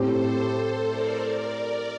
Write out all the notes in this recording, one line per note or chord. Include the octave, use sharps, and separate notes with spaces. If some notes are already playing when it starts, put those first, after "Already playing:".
Already playing: A2 A3 C4 G4 A4 C5
A4 C5
A#4 D5
A#4 D5